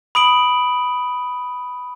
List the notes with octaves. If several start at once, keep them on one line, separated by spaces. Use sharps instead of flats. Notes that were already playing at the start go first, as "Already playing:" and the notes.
B5 D#6 D7 F#7